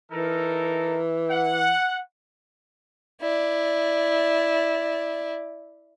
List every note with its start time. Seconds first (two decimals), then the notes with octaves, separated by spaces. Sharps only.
0.12 E3 D#4 A4 A#4
1.30 F#5
3.21 E4 D5